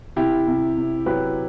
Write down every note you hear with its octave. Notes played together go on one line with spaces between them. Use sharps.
C3 E4 G4
C3
C3
F#3 G4 B4